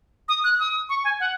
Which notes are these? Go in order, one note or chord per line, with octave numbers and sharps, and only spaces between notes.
D#6
F#6
D#6
C#6
G#5
F#5